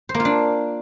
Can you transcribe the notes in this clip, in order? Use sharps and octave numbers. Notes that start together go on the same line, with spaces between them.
C5
A#3
F4
D4